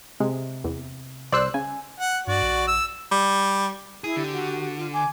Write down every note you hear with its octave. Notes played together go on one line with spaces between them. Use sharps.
C3 G#3
E2
C2 C5 D5 C6 E6 F#6
C#3 G#5
F#5
G2 F#4 D5
A#1
E6
G3
E4 G#4
D3 G4
F#4
F4
G#5 D6